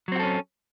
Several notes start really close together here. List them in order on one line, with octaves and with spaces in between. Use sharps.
F#3 C4 F#4 A4 C#4